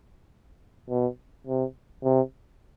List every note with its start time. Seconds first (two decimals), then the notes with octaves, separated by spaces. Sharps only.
0.90 B2
1.47 C3
2.04 C3